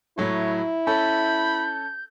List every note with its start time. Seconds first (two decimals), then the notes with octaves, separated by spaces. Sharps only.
0.18 A2 F#3 A3 E4 C#5
0.87 C#4 A4 B5 G6